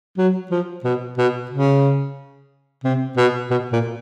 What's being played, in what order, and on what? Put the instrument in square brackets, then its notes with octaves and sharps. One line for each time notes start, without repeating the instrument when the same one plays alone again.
[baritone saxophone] F#3
F3
B2
B2
C#3
C3
B2
B2
A#2